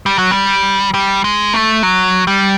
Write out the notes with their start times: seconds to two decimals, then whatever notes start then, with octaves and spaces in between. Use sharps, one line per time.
0.06 G3
0.18 F#3
0.31 G3
0.94 G3
1.24 G#3
1.54 A3
1.83 F#3
2.27 G3